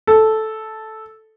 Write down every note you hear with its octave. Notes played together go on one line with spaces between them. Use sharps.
A4